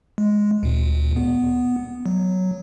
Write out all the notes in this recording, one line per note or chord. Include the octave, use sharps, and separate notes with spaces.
G#3
D2 A#2
B3
F#3